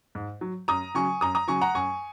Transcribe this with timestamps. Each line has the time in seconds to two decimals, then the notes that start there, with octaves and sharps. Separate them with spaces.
0.15 G#2
0.41 F#3
0.68 F#2 A#5 D#6
0.95 C#3 F#3 G#5 C#6
1.21 F#2 A#5 D#6
1.35 A#5 D#6
1.48 C#3 F#3 G#5 C#6
1.61 F#5 A#5
1.75 F#2 G#5 C#6